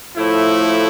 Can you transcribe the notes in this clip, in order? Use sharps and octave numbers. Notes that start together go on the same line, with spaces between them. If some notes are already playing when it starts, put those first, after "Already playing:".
A2 F3 A3 E4